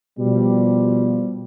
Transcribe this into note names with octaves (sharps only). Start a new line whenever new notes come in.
B2 F3 G3